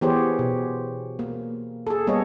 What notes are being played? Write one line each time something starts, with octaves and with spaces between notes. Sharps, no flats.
E3 B3 G4 G#4 C5 C#5
B2
A#3
G#4 A4
G3 A#3 B3 A4 C#5 D#5